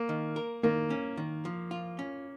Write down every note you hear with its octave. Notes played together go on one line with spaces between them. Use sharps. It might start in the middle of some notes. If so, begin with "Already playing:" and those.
Already playing: A#3
D#3
A#4
D#3 A#3
C#4
D#3
F3
F4
C#4